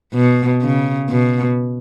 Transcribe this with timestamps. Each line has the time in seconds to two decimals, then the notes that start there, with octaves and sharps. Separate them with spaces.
0.14 B2
0.62 C#3
1.10 B2